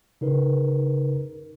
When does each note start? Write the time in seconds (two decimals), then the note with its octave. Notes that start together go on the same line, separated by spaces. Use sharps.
0.21 C#3 D#4 A#4 B4